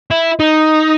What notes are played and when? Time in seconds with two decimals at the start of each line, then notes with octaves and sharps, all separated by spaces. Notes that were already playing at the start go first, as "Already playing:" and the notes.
0.11 E4
0.39 D#4